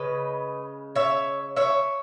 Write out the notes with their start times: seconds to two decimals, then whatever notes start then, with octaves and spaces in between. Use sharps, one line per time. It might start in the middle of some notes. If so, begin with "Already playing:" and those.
Already playing: C#3 G#3 B4 D#5
0.96 C#5 E5
1.56 C#5 E5